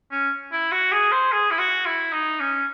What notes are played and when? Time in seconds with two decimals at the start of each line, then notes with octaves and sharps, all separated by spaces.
0.11 C#4
0.52 E4
0.72 F#4
0.92 G#4
1.12 C5
1.32 G#4
1.51 E4
1.59 F#4
1.86 E4
2.13 D#4
2.40 C#4